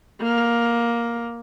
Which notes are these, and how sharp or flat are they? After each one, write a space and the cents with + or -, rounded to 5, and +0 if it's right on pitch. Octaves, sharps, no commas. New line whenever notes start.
A#3 +10